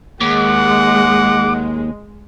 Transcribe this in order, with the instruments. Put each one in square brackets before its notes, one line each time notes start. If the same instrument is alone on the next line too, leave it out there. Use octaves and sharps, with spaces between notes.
[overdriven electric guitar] D#2 [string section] G#3 [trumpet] F#5 [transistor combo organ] D6